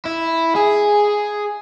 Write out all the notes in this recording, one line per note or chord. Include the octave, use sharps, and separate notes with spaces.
E4
G#4